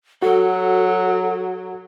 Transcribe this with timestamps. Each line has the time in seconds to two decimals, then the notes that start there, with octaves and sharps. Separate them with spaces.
0.22 F#3 F#4 A4